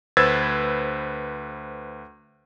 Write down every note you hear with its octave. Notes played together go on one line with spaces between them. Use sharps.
D2 B4 C5 E6 G#6 A6